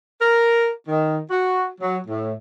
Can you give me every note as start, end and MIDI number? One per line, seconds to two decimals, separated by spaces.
0.21 0.69 70
0.88 1.19 51
1.31 1.68 66
1.81 1.98 54
2.08 2.34 45